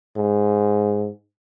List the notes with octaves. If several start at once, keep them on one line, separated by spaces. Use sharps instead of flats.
G#2